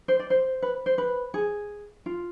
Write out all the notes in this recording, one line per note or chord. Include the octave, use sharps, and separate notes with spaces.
C5
D5
C5
B4
C5
B4
G#4
F4